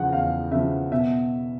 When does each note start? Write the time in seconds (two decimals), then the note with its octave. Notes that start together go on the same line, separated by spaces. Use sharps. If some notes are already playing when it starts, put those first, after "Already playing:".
Already playing: E2 C#3 F3 F#5
0.13 E2 F5
0.52 C#3 F3 E5
0.91 B2 E5